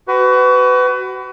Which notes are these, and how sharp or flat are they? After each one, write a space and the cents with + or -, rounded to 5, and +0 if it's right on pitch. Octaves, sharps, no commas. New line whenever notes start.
F#4 +30 B4 +25